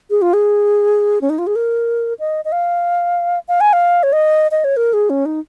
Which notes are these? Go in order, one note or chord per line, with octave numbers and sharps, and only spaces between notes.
G#4
F4
G#4
C#4
D#4
F4
G#4
A#4
D#5
D#5
F5
F5
G#5
F5
C#5
D#5
D#5
C#5
A#4
G#4
C#4
D#4